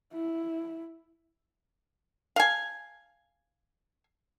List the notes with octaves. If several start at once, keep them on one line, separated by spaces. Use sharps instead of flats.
E4
F5 G#5